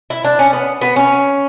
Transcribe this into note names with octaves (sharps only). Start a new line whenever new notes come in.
E4
D4
C#4
B3
B3
C#4